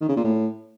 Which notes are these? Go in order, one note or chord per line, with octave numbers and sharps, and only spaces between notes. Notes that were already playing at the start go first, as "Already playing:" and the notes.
D#3
C#3
A#2
A2